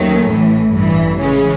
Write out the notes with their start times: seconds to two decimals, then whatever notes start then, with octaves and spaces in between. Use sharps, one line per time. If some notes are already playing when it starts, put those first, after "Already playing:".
Already playing: D#2 D#3 F#3 A3 C#4
0.28 A1 A2 E3
0.74 A1 G2 E3
1.20 C#3 E3 G#3 C#4